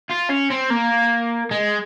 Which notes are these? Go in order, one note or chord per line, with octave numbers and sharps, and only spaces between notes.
F4
C#4
C4
A#3
G#3